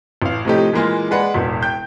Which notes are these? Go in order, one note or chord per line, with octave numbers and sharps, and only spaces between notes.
A1 F5
A2 C3 F3 A3 D#4 G4
A#2 E3 G#3 A#3 F4
G#3 G#4 B4 D5 F#5
E1 A1
G5 G6